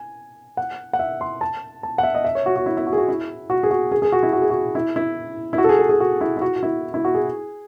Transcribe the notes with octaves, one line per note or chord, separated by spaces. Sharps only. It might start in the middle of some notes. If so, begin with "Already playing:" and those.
Already playing: G#5
F#5
F#5
E5
C6
A5
A5
F#5
E5
D#5
E5
C#5
F#4
F#4
E4
E4
F#4
G#4
F#4
E4
F#4
G#4
F#4
G#4
G#4
F#4
E4
F#4
G#4
F#4
E4
E4
E4
F#4
A4
G#4
A4
G#4
F#4
E4
E4
F#4
F#4
E4
E4
F#4
G#4